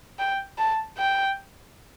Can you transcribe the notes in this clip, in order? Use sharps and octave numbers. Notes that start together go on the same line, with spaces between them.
G5
A5
G5